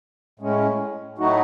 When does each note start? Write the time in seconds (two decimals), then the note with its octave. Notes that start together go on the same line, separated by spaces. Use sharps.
0.39 A2 G#3 C#4
1.18 A2 F#3 A3 D#4 F#4